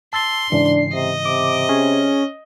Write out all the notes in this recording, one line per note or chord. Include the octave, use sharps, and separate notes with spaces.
A5 C6 E6 A6
G#2 C#3 E3 D4 C7
C3 D#5
C3 D6
C#4 G#4